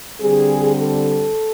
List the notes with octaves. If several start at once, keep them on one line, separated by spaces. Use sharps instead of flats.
D3 G3 C4 G#4
A4